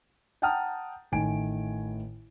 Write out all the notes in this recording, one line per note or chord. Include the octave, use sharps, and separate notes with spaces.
F#5 G5 A5 A#5 D#6 F6
A1 A2 D#3 G#5 D7